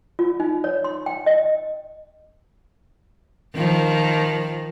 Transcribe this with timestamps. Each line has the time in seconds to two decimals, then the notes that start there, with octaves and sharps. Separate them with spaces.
0.19 F4
0.40 D#4
0.64 C#5
0.84 C6
1.06 G5
1.26 D#5
3.55 D#3 F3